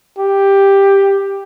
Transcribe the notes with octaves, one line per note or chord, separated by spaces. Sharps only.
G4